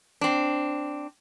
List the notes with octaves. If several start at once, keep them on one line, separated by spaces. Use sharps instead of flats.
C4 D4